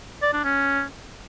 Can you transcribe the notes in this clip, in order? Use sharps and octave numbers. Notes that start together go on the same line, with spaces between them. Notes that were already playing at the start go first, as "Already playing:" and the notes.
D5
D4
C#4